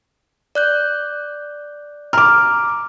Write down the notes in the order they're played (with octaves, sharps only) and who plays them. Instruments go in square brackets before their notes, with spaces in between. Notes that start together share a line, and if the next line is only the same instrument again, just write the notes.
[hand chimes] D5 F#6 G6
[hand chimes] A#5 [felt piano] D6 F6